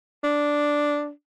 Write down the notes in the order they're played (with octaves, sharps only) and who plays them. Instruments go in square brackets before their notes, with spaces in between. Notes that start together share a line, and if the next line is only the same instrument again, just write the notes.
[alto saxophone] D4